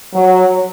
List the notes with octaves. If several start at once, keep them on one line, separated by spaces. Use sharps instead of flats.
F#3